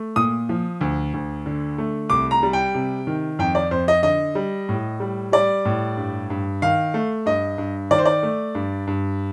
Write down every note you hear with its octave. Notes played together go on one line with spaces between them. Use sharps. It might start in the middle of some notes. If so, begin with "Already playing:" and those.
Already playing: A3
A#2 D#6
F3
D2
D2
D3
A3
C2 D6
A#5
G3
G5
C3
D#3
F2 G5
D5
F2 C5
D#5
D3 D#5
G3
A2
G3
G3 D5
A2
G2
G2
D#3 F5
A3
G2 D#5
G2
D#3 D5
C5
D5
A3
G2
G2